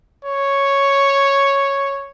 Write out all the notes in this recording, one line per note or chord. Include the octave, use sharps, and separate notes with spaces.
C#5